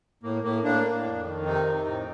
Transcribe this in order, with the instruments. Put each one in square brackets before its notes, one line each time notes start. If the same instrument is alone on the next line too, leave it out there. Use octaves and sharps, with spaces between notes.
[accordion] A2 A#3
A2 A#3
A2 A#3 D4
A2
F2
D#3
C3 C4 D#4
F2
A2